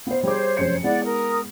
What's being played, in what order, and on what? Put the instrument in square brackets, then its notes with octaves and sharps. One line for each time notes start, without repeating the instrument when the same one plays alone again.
[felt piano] B3 C5 [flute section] F5
[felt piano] G3 G#4 D6 [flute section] C5 C#5
[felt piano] F1 F#2 C#7
[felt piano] G#3 B3 E4 [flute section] D5 F#5
[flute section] A#4 D#6